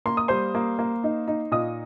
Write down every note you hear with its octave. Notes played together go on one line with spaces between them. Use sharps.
A#3 C6
D#6
G3 C5 C6
A#3
A#3
D#4
D#4
A#2 D#5 D#6